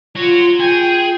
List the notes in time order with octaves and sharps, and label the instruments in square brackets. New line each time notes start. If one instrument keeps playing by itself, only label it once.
[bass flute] F4 [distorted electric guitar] F#4 C#5
[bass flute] F4 [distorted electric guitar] G#4 [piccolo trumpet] G5